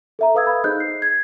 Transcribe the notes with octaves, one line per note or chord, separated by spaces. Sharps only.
A4 E5 A#5
A4 B4 F5 D#6 E6 G#6
B5
D#4 G#4 C5 D#5 F#6 G6
C7
G#6